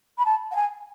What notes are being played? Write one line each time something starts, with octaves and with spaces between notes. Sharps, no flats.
B5
A5
F#5
G#5